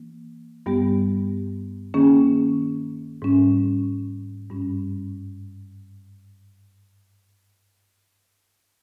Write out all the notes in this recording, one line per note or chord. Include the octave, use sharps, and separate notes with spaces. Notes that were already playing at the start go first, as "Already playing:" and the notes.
Already playing: E3 A#3
G2 G3 B3 G4
D#3 A#3 C#4 G#4
G#2 G3 C#4
G2 G3 C#4